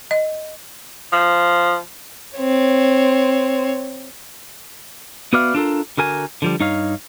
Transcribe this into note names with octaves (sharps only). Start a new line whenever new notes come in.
D#5
F3
C4 C#5
B3 F#4 B4 D5 E5 F5
D4 F4 A4 A#4
D3 F#4 A#4 G#5
D3 F3 G3
G2 D#4 C#5 F5